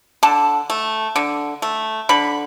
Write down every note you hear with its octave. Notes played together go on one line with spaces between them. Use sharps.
D3 A5
A3
D3
A3
D3 B5